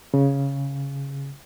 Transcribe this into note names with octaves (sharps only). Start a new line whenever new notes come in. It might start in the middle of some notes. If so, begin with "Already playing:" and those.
C#3